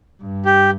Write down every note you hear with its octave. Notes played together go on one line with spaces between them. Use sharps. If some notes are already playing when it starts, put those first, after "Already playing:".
G2
G4